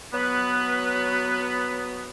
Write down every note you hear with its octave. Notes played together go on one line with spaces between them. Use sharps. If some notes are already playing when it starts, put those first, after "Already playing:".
F#3 B3 B4